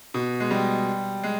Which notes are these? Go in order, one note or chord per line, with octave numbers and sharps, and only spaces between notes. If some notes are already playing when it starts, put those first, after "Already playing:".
B2
G#3
G3
G#3